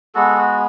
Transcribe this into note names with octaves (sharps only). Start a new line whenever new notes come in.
G#3 B3 F#4 A4
F#4